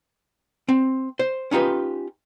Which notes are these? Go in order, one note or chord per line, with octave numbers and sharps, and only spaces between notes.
C4
C5
C#4 D#4 F4 G4 B4